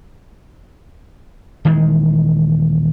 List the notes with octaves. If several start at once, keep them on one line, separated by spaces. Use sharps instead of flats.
D#1 D#3 E3 G#3